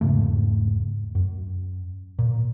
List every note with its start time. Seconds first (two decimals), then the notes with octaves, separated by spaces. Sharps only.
0.01 E1 G#2 C#3 A3
1.15 F#2
2.19 A#2